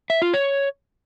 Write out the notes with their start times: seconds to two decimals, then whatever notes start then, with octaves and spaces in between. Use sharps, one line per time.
0.10 E5
0.22 F4
0.34 C#5